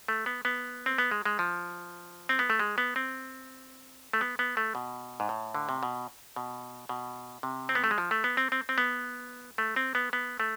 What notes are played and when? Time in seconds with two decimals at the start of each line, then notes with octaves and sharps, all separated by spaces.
0.08 A3
0.26 B3
0.45 B3
0.86 C4
0.98 B3
1.11 G#3
1.25 G#3
1.39 F3
2.29 C4
2.39 B3
2.50 A3
2.59 G#3
2.78 B3
2.96 C4
4.13 A3
4.21 B3
4.39 B3
4.57 A3
4.75 B2
5.20 G#2
5.29 A2
5.55 D3
5.69 C3
5.83 B2
6.36 B2
6.89 B2
7.43 C3
7.69 C4
7.75 B3
7.84 A3
7.91 G#3
7.98 F3
8.11 A3
8.24 B3
8.37 C4
8.52 C4
8.69 C4
8.78 B3
9.58 A3
9.76 C4
9.95 B3
10.13 B3
10.40 A3